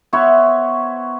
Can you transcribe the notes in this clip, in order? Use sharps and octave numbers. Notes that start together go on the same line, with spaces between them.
B3 E4 C5 C#5